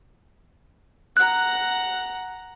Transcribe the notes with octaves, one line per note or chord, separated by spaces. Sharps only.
F#5 A#5 F#6